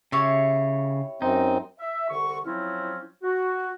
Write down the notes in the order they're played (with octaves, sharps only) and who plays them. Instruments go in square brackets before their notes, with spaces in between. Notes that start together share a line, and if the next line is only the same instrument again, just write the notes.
[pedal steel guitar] C#3 [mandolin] E4 G4 C#5
[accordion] F#2 C4 [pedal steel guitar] D#4
[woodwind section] E5
C2 D3 C#6
F3 F#3 C4 C#4 E4
F#4